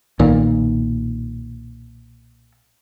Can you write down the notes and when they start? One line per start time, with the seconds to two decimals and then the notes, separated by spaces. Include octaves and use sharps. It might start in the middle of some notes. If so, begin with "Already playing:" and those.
0.19 B1 A#2 D#3